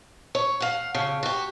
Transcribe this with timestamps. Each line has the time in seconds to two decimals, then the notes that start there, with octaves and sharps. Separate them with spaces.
0.35 C#5
0.60 F5 F#5
0.95 F2 C#3
1.23 F#4 G4